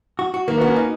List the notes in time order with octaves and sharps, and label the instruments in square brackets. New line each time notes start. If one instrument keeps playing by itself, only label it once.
[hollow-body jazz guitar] F#4
F#4
[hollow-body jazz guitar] D#3 [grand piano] A#3
[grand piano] B3
[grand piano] C#4 [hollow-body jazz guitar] F#4
[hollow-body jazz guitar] D#4